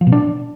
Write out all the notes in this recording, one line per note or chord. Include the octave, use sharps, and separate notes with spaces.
F3
B2
D4